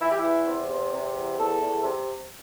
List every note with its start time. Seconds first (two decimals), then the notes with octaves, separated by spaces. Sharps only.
0.01 E3 E4
0.11 G4
0.19 E4
0.24 E2
0.47 C3
0.70 E2
0.93 C3
1.15 E2
1.39 E2 A4
1.61 E2
1.83 C3